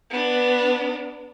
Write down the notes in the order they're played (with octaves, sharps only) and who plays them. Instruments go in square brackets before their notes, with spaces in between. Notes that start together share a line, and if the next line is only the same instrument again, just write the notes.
[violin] B3 D4